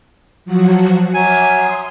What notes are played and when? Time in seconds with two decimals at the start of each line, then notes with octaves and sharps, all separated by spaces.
0.45 F3 F#3 F#4
1.14 F#3 E5 G#5 D6 F6
1.53 C6 D#6